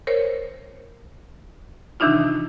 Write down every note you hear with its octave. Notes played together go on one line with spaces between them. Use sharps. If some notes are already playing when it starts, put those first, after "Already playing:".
A#4 C5 C#5
C3 D#3 E3 D4 D#4 F4